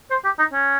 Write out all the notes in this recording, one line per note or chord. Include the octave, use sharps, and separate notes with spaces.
C5
G4
D#4
C#4